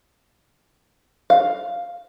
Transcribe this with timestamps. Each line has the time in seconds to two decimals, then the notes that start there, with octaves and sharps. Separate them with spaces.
1.30 F5